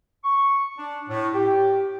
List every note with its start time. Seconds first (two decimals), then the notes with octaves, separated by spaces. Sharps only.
0.24 C#6
0.77 D4
1.09 A2
1.34 G4